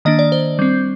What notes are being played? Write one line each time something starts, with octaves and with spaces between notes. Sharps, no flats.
D#3 A#3 D4 D#5
D5
C5
G3 C4